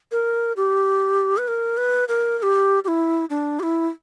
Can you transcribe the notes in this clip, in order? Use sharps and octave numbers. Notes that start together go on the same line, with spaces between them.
A#4
G4
B4
A#4
B4
A#4
A#4
G4
G4
E4
D4
G4
E4